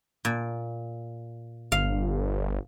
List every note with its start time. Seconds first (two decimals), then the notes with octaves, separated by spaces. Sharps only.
0.25 A#2
1.72 G1 F5